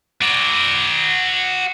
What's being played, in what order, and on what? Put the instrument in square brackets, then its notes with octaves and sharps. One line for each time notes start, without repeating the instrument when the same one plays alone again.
[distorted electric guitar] F#4 D5